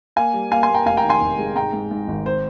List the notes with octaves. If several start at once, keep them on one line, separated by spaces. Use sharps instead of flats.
A#3 F5 G#5
G3
A#3 F5 G#5
G#5 C6
A#3
G5 A#5
F1 F5 G#5
G5 A#5
D#3
G#5 C6
F1
G#3
G#2 G5 A#5
G#2
G#2
G#1
C5